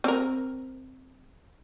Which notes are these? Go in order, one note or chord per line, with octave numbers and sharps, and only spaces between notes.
C4 A#4